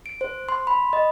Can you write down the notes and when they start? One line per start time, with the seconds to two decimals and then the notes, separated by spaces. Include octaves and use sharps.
0.06 D7
0.21 C5
0.49 C6
0.67 B5
0.93 D#5